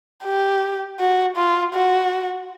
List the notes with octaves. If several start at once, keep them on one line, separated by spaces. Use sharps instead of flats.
G4
F#4
F4
F#4